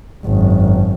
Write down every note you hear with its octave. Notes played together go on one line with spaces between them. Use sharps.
G#1 F#2